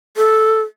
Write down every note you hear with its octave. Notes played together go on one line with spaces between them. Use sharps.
A4